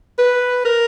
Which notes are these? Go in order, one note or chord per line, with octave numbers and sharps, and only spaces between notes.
B4
A#4